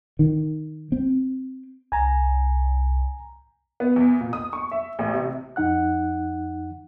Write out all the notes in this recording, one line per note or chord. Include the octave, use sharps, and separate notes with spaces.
D#3
C4
C2 G#5 A#5
B3
E2
A#2
D#6
C#6
E5
A1
C3
F2 D#4 F#5 F#6